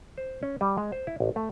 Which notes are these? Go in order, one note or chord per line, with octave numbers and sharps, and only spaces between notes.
C5
C#4
G3
G#3
C5
E4
A1
A3